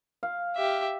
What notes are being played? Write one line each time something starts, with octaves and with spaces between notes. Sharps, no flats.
F5
G4 E5